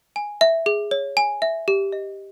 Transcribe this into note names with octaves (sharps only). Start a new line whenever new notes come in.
G#5
E5
G#4
C#5
G#5
E5
G4
D#5